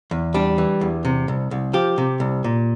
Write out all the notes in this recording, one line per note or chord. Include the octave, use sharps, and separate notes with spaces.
E2
G3 D4
E3
E2
C3
C2
C2
F3 G4
C3
C2
A#2